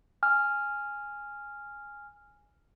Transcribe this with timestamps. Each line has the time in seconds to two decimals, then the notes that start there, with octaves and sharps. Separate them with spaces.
0.23 G#5 F6